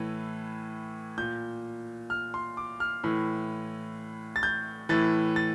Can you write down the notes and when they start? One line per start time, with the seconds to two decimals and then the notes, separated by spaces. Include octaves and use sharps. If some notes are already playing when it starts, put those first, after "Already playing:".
Already playing: A2 E3
1.18 A#2 G6
2.10 F6
2.34 C6
2.57 D6
2.80 F6
3.04 A2 E3
4.36 A6
4.43 G6
4.89 A2 E3 A6
5.36 A6